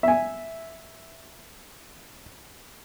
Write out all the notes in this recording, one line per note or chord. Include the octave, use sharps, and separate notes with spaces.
E5 G#5